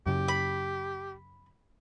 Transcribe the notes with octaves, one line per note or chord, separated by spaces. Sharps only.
F#2 C#3 G4
B5